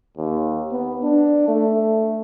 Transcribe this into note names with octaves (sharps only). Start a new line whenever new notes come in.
D#2
B3
D4
A3